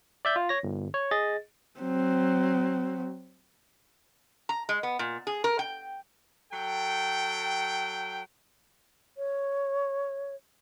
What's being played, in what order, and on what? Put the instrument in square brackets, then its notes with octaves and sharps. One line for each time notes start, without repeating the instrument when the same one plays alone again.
[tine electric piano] D5 E5 G6
F4
C#5 A#6
G1
C#5
G#4 D#5 A6
[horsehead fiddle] F#3 C4
[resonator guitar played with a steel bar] A#5
G#3
B3
A#2
G#4
A#4
G5
[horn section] F#3 A4 G5
[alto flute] C#5